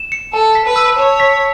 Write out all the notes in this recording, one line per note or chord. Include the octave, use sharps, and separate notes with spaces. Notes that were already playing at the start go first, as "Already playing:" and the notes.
Already playing: E7
C#7
A4 A5
B6
B4
E6
C#5 A5
B6